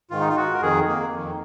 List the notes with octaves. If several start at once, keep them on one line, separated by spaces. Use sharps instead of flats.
G#2 D#3 F4
D#4
F4
F#4
A#4
F2 D#3 G#4
A#3
F2 D#3